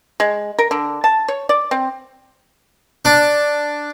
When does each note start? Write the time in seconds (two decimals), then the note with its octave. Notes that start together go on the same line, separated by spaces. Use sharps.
0.20 G#3
0.58 A#4
0.71 D3
1.04 A5
1.28 C#5
1.49 D5
1.71 C4
3.05 D4